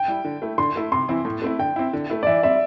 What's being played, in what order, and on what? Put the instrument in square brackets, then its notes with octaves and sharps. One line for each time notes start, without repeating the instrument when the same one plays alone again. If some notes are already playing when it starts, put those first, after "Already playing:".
Already playing: [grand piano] G5
[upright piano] G3 E4
D3
A3 E4
[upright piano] D3 [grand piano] C6
[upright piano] A3 E4
[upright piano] C3 [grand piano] C6
[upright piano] E3 C4 E4
A2
A3 C4 E4
[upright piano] D3 [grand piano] G5
[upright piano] C4 E4
D3
A3 E4
[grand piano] D5
[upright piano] E3 [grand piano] E5
[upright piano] G3 C4 [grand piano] E5